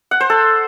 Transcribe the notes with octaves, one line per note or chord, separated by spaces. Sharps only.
F#5
C5
A4